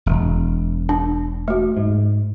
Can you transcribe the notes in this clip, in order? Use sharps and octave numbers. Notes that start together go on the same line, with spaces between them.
E1
D4
A3 F#4
G#2